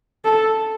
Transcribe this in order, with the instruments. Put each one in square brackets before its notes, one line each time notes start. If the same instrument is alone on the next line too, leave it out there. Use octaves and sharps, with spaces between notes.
[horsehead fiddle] A4